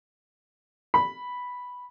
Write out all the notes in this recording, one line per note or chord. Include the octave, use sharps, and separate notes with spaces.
B5